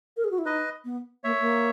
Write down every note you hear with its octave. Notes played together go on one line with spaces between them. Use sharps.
A#4
G#4
F#4
E4
D#4 B4 D#5
B3
A#3 C#5 E5
A#3